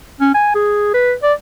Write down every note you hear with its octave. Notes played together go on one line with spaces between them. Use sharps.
C#4
G#5
G#4
B4
D5